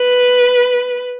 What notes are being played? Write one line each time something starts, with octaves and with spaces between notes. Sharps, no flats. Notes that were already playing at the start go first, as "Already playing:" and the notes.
Already playing: B4